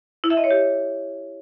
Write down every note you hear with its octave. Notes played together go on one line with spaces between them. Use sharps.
E4
E5
D#5
C#5
G4